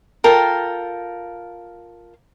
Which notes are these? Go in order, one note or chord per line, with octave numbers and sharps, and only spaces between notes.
F4 A4 A#4 G5